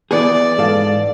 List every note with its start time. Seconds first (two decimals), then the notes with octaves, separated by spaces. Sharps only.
0.11 E3 B3 G#4 D5
0.58 G#2 A4 F5